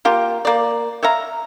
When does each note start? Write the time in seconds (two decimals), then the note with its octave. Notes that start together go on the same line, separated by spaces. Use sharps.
0.05 A#3 F4 G4
0.45 A#3 D5
1.02 C#5 E5 F5 A#5